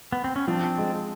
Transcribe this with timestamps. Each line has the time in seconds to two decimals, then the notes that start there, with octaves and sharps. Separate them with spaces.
0.12 B3
0.24 C4
0.36 C#4
0.48 F3 C4 D4
0.78 G#3